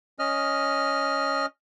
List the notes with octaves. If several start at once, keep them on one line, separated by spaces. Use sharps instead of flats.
C#4 D#5 F6